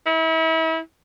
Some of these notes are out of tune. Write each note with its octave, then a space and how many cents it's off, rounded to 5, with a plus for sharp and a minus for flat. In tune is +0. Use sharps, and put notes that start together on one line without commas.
E4 -35